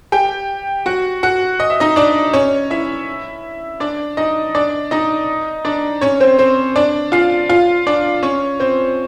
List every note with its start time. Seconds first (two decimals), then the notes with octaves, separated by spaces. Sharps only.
0.12 G4 G5
0.86 F#4 F#5
1.23 F#4 F#5
1.60 D#5
1.70 E5
1.80 D#4 D#5
1.96 D4 D5
2.33 C#4 C#5
2.70 E4 E5
3.80 D4 D5
4.17 D#4 D#5
4.55 D4 D5
4.91 D#4 D#5
5.65 D4 D5
6.01 C#4 C#5
6.20 C4 C5
6.38 C4 C5
6.76 D4 D5
7.12 F4 F5
7.49 F4 F5
7.87 D4 D5
8.23 C#4 C#5
8.60 C4 C5